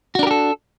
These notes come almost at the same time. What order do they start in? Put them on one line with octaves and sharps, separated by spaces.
F#4 D4 A#4 G4 A4